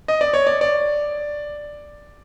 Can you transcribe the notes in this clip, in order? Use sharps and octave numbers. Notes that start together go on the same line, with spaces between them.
D#5
D5
C#5
D5
D5